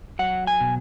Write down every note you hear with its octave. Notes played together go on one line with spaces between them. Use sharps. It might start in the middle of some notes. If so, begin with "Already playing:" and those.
F#3 F#5
G#5
B2